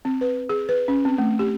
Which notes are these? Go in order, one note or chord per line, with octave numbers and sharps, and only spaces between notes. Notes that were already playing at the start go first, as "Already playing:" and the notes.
C4
B4
G#4
B4
C#4
C4
A3
G4